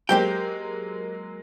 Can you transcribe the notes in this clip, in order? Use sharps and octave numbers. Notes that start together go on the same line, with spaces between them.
F#3 G#3 A#3 G4 C5 G5